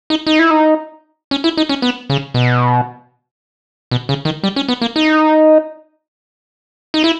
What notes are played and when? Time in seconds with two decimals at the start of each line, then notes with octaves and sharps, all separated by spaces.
0.10 D#4
0.27 D#4
0.39 E4
0.51 D#4
1.31 C#4
1.44 E4
1.57 D#4
1.69 C#4
1.82 B3
2.10 C#3
2.34 B2
3.91 B2
4.09 C#3
4.25 D#3
4.44 G3
4.56 C#4
4.69 B3
4.82 A#3
4.96 D#4
6.94 D#4
7.04 E4